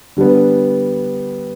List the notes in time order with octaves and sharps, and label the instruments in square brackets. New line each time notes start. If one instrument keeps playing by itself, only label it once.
[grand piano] D3 G3 B3